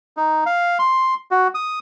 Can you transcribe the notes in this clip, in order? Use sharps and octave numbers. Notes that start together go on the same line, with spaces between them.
D#4
F5
C6
F#4
D#6